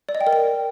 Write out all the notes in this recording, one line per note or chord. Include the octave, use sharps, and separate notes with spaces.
D5
D#5
G5
A#4
G5